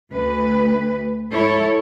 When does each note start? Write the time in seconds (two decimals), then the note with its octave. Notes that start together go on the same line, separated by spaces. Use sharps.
0.10 D2 B4
1.31 G#2 E4 A4 C#5